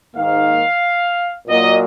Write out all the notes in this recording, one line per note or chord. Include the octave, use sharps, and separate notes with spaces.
G#2 D#3 A#3 F5
A#2 F#3 A#3 D#5